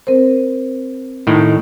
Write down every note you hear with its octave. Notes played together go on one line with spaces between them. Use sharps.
C4 A#4 C5
A2 D#3